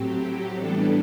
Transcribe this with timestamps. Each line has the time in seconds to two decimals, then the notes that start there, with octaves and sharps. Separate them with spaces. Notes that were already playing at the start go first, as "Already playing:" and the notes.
Already playing: A2 F#3 C4 G4
0.57 A2 E3 G3 B3 D4 A4